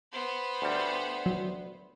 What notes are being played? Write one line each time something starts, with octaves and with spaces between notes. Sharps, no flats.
B3 C5
D2 G3
F#3